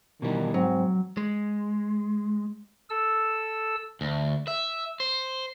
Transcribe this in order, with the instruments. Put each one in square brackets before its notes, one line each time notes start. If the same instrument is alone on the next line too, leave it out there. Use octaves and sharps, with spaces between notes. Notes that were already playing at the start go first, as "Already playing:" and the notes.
[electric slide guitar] B2 E3 G3 [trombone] D#3
[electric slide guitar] G#2 [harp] F#3 [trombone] C4
[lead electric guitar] G#3
[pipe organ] A4 E6
[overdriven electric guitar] D2
E5
C5